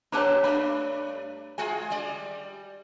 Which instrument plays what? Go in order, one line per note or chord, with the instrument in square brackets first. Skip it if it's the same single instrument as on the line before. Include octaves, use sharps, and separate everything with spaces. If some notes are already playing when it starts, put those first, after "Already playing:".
[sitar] A#3 C4 G4 [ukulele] D4 B4 A5 [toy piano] C#5 A#5
[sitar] G2 A3 D4 [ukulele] B5
[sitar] G#3 F4 G#4 [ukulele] G#5
[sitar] G3 D5